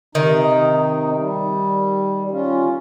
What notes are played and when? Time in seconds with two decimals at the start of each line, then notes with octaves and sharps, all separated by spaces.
0.15 C3 D#3 D#4
1.18 G3
2.31 C#4 F4